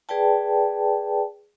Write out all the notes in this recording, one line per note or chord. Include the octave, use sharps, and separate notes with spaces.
G#4 B4 D5 G5 A5